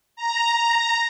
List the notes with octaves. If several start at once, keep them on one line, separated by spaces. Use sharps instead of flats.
A#5